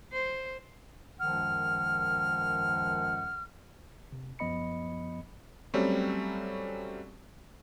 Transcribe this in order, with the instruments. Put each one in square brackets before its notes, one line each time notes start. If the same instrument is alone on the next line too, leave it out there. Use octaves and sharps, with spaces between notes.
[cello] C5
[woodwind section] C#2 F#2 D#3 F3 F#5 F6
[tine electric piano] C3
F#2 F3 B3 D#5 B5 C#7
[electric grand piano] F#3 G3 A3 C4 C#4